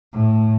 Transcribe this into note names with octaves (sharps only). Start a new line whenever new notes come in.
A2